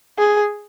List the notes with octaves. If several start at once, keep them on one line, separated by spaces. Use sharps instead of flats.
G#4